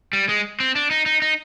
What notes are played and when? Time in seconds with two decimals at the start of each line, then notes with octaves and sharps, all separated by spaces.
0.13 G3
0.29 G#3
0.60 C4
0.76 D4
0.91 D#4
1.06 D#4
1.22 D#4